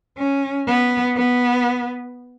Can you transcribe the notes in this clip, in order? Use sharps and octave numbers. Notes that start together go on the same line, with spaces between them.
C#4
B3
B3